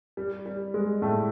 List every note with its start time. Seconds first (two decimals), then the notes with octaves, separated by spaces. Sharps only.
0.17 G3
0.46 G3
0.74 G#3
1.02 A2 A3